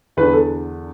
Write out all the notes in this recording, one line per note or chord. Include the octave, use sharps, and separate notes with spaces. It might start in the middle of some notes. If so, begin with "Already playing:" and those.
E2 D3 B4
A4